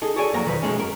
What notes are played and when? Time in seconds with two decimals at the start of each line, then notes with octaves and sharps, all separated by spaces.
0.02 D#4 G#4 A4
0.16 F#4 G#4 A4 C#5 D5 G#5
0.33 F2 F#3 A#3 A#5
0.45 B1 E2 D#3 F3 B4
0.62 B2 D#3 F#3 G#3 A3 C#4
0.78 F#2 A#4